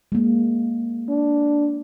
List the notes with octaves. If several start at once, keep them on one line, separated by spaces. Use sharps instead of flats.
G#3 A#3
D4